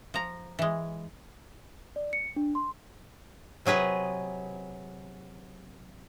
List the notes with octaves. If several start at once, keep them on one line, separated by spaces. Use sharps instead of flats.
F3 A#5
E3 G#3
D5
C#7
D4
C6
C3 F#3 G#4 B4 D#5